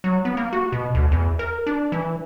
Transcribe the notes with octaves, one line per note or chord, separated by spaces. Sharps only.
F#3
B3
A#3
F#4
B2
D2
E2
A#4
D4
E3